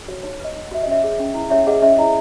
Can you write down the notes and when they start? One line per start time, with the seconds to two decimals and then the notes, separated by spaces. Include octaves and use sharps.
0.08 F#4 C#5
0.23 D#4 C#5
0.40 B4 D#5
0.56 D#4
0.67 F#5
0.71 F#4 E5
0.83 D#5
0.87 C#4 C#5 E5
1.04 G#4
1.19 C#4
1.34 E4
1.50 C#4 C#5 E5
1.67 G#4 D#5 F#5
1.82 C#4 C#5 E5
1.98 E4 D#5